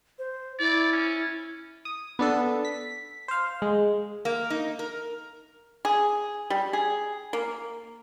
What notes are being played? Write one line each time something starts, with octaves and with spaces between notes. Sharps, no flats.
C5
E4 D5
C#4
D#6
B3 D4 A4
B6
C5 F5
G#3
A#3
D#4
A#4
G#4
G3
G#4
A#3